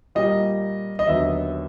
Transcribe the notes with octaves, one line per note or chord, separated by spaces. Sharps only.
A#2 G3 A#3 D#5
D#5
D#2 D3 F#3 B3 E5